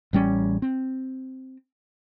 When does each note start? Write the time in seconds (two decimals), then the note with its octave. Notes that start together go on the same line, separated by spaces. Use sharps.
0.13 A1 G3 C#4
0.62 C4